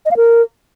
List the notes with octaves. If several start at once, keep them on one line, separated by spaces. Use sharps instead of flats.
D#5
F5
A#4